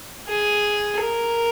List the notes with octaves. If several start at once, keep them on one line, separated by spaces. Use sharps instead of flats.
G#4
A#4